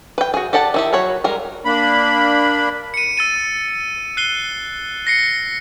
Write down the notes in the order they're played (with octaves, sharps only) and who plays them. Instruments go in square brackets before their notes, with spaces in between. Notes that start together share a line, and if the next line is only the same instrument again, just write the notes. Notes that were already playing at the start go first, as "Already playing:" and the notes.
[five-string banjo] B4 G5
F#4 G#4
G4 A4 D5 F#5 A5
D#3 E4 G4
F#3 F#4 C#5 B5
G3 G#3 A#4
[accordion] A#3 D4 B5
[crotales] C#7 D#7
E6 A6 D#7
F#6 C7 D#7 G7
A#6 C7 C#7